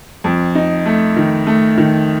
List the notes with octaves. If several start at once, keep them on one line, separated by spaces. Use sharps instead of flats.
F2
D#4
A3
D#3
A3
D#3